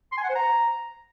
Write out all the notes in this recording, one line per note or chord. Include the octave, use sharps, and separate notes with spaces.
C6
G#5
F#5
C5
A#5